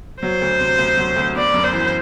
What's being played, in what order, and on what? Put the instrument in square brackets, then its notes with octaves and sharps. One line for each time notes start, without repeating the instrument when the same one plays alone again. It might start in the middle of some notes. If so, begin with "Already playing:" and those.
[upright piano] F#3 [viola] C5
[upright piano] D2
C3
D2
F#3
D2
[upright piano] B3 [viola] D5
[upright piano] F#2
[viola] C5
[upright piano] E3